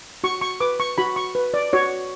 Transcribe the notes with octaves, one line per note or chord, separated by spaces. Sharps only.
F#4 C#6
C#6
B4 D6
C#6
F#4 B5
C#6
B4
D5
F#4 C#5